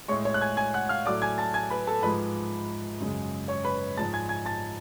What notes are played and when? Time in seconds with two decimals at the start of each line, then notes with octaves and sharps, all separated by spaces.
0.08 G#3 C#5 C#6
0.12 A2
0.25 C#5 C#6
0.34 F#6
0.41 G#5 G#6
0.57 G#5 G#6
0.74 F#5 F#6
0.89 F5 F6
1.06 A2 F#3 A3 D5 D6
1.22 G#5 G#6
1.38 A5 A6
1.54 G#5 G#6
1.70 B4 B5
1.87 A4 A5
2.03 G#2 F3 G#3 B4 B5
3.00 F#2 C#3 G#3
3.48 C#5 C#6
3.65 B4 B5
3.97 G#2 F3 G#3 A5 A6
4.13 G#5 G#6
4.29 G#5 G#6
4.45 A5 A6